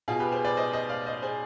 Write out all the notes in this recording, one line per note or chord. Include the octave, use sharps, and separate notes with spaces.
B2 F4 G#4
G4 B4
G#4 C5
B4 D5
C5 D#5
C5 D#5
D5 F5
C5 D#5
G#4 C5